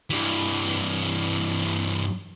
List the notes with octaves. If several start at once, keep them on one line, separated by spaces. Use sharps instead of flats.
G2 E3